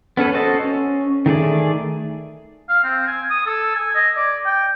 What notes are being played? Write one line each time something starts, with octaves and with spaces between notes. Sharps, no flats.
B3 C#4 A4 B4
F#4 A4 C5 D#5 A5
C#4
D#3 A3 G#4 D5
F5
C4
G#5
D#6
A4
G#5
D#5
D5
G5